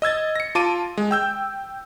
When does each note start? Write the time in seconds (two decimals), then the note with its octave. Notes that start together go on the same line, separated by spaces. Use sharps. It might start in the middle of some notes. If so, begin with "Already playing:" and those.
0.02 D#5 E6 G#6 A6
0.36 A#6 C#7
0.55 F4 A5 D6 D7 D#7
0.98 G#3
1.11 G5 E6 G6